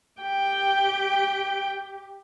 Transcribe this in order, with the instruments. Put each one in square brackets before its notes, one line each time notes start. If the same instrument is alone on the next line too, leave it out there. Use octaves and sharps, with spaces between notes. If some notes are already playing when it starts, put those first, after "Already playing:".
[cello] G4 [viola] G5